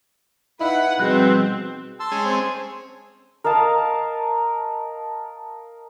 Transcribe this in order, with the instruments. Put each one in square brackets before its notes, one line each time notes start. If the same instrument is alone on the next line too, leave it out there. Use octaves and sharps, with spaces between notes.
[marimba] D#4 D#5 F5 [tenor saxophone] E4 [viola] B4 F#5
[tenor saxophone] B2 [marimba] F3 G3 G#4 [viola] C4 [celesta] F#6
[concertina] A5 C6 E6
[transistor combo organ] G#3 C#4 G#4
[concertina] C4 C5 G5
[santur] A#4 D#5 F5 A5